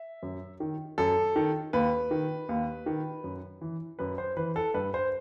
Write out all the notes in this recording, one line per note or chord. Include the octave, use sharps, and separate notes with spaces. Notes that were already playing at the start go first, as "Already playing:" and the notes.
Already playing: E5
F#2
D#3
F#2 A4
D#3
D#2 B4
D#3
D#2
D#3
F#2
E3
F#2 B4
C5
E3 B4
A4
G2 B4
C5